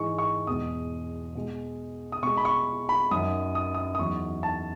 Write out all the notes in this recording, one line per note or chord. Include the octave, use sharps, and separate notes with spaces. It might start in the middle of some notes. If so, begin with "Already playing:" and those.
Already playing: G#2 E3 G#3 C#6
C#6
E2 B2 G#3 D#6
B2 G#3
D#6
B2 G#3 C#6
B5
C#6
B5
F#2 D#3 F#3 D#6
D#6
D#6
D#6
E2 D#3 F#3 C#6
A5